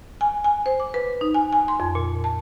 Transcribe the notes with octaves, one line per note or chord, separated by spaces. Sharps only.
G#5
G#5
C5
D6
B4
D#4
G#5
G#5
C6
F2
A#2
A5